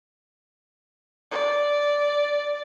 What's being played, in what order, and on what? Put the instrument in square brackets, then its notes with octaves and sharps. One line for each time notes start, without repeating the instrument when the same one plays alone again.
[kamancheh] D5